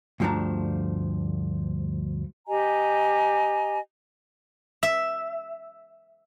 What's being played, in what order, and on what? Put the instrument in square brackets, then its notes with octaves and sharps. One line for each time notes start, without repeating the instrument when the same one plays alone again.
[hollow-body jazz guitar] D2 G2 F3 A3 D4 A#5
[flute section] G4 D#5 G#5 A#5
[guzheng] E5